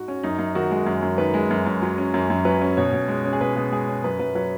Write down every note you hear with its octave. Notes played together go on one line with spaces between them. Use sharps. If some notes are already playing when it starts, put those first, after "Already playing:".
Already playing: G#2 F#4
C#4
F#2 D#4
F#2
D#3 F#4
G#3
F#2
F#2
D#3 B4
G#3
F#2
F#2
F#3
C#4
F#2
F#2
F#3 B4
C#4
B2 C#5
B2
G#3
C#4
G#4
B2 B4
B2 G#4
G#3 G#4
C#4
F#2 B4
F#2 B4
F#3 B4